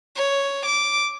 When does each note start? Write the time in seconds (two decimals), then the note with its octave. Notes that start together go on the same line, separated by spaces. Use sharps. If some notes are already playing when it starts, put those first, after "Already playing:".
0.16 C#5
0.66 D6